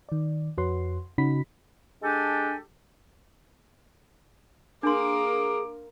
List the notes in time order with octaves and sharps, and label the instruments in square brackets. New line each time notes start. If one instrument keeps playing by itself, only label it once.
[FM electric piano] D#3 D5
F2 F#4 B4 C#5 F#5 C6
C#3 C#4 D#4 F#4 B5 B6
[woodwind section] G#3 D4 G4 A4 G#5
[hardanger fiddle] A#3 A#4 [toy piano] D4 C6 [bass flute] G#4 [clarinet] D6